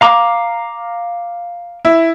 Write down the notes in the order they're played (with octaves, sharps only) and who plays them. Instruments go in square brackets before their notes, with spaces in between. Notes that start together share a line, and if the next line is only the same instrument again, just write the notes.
[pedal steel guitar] F5 A#5 D6
[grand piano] E4